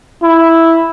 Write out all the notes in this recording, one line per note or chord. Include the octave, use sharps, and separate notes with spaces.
E4